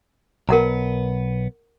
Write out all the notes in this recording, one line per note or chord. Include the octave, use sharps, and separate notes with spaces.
B1 B3 A#4 F#5 A#5